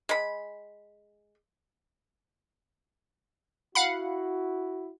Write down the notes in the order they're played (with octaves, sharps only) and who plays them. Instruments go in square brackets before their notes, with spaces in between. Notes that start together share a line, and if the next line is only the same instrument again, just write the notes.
[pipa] G#3 B5
[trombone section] E4 F#4 [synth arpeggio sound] F5 F#5 B5